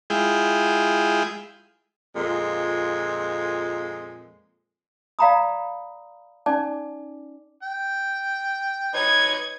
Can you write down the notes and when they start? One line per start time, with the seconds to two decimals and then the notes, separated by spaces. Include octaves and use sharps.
0.10 G#3 E4 F4 G#4 G5
2.16 F2 A#2 G#3
5.19 D5 F5 G5 A#5 B5 D#6
6.46 C#4 D#4 D5 G#5 D6
7.63 G5
8.94 D#4 B4 C#5 G#6